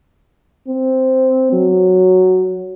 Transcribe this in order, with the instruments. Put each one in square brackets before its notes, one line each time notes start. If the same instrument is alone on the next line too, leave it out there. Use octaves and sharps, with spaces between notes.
[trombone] C4
F#3